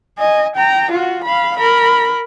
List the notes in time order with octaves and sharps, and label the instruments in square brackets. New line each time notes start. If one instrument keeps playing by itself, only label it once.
[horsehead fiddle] D#5 G#5
G5 A#5
F4 F#4
F5 B5
A#4 B5